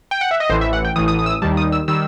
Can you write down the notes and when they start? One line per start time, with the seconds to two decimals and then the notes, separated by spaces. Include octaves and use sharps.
0.11 G5
0.21 F#5
0.31 E5
0.40 D#5
0.50 A1 A2 E3 C5
0.61 E5
0.73 F#5
0.85 G5
0.96 A1 A2 E3 D#6
1.08 D#6
1.19 D#6
1.26 E6
1.31 D#6
1.42 D#2 D#3 G3 A5
1.57 D#6
1.72 E6
1.88 D#3 G3 E6